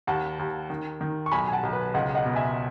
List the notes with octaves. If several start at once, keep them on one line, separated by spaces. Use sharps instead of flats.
D#2 F#5 A5
D#2
D#3
D#3
C#6
B1 G#5 B5
G#5
F#5 A5
B1
B4
C#2 D#5 F#5
D#5 F#5
B2
E5 G#5